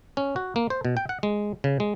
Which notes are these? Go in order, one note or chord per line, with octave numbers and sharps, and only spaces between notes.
C#4
F#4
A#3
C5
B2
G5
F#5
G#3
C#3
G#3